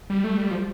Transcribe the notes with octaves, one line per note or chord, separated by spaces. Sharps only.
G3
A3
G3
F3